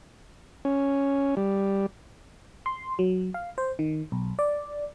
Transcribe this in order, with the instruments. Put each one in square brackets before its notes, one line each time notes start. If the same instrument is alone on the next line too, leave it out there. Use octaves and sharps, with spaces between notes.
[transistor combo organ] C#4
G3
[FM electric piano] C6
F#3
F5
C5
D#3
B1
D5